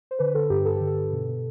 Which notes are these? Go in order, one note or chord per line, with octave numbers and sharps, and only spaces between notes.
C5
D3 B4
D3 A4
G2 G4
G2 A4
D3 G4
A4
D3
B2
B2